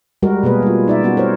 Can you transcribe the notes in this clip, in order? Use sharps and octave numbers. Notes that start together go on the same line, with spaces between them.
G3 G#3 F#4 A#4
B2 A#3 G#4 B4
G3 F4
D#4 D5 E5
G3 B3 C#4 F#4
A#4 C5 C#5